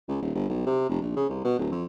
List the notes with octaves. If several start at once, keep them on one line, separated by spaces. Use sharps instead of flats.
C#2
D#1
G1
B1
C3
F1
A#1
C#3
C2
B2
D1
F2